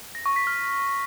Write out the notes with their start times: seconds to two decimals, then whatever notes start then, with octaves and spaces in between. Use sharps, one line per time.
0.15 A#6
0.26 C#6
0.36 B6
0.47 F6